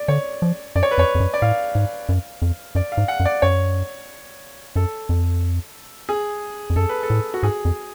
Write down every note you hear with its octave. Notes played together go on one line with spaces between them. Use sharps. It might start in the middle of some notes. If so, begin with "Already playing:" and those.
Already playing: D5
D3 C#5
F3
F#2 D5
C#5
B4
F2 C#5
F2
F#2
D5
A2 F5
G#2
F#2
F2
F#2 D5
F5
G#2
F#5
F#2
D5
F#2 C#5
F#2 A4
F2
G#4
F2
F#2 A4
B4
A4
A2
F#4
G#2 G#4
F2